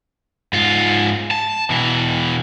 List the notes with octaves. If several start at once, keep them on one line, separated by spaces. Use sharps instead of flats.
G#2 F4
A5
B2 E3